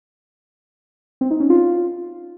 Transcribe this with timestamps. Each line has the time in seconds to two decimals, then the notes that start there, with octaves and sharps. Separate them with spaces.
1.21 C4
1.31 D#4
1.40 C#4
1.50 F4